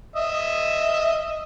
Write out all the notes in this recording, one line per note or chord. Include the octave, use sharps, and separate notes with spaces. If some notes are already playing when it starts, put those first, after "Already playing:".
D#5 E5